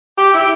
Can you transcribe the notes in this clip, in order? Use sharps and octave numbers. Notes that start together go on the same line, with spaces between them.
G4
E4
G4